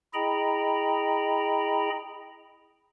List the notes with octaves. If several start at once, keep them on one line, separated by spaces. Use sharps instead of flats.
E4 G#4 D#5 G5 A#5 B5